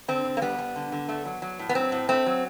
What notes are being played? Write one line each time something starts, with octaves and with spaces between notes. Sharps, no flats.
D3 C4
D3
A#3
G3 B3
G3
D3
D3
A3
F#3
F#3
A2
B3
F#3 C4
A2
A3 C4
F#3